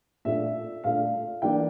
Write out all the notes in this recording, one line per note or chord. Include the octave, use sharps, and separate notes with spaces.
A#2 A3 D4 E5
A#2 A3 D4 F5
E3 A#3 D4 G5